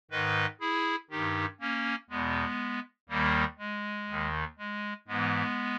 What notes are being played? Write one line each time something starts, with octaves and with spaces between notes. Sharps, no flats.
G#2 D#3 B4 D#5
E4 G#4
G2 D#3 D#4 G4
A#3 C#4
E2 B2 G#3 B3
D#2 D#3 G3 A#3
G#3
D#2 D#3
G#3
G#2 E3 G#3 B3